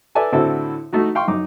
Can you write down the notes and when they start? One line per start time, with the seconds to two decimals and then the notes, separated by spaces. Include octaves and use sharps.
0.15 A4 B4 D5 E5 G#5 A5
0.32 A2 D3 C4 E4 F#4 A4
0.93 A3 D#4 F#4
1.15 F5 G5 C6 C#6
1.28 F#2 D#4 D6